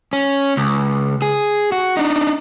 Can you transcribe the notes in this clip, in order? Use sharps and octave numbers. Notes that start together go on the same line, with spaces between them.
C#4
C#2
G#4
F#4
D4 D#4